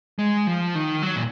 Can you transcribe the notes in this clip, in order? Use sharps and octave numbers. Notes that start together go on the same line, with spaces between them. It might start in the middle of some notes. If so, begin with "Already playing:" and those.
G#3
F3
D#3
F#3
A#2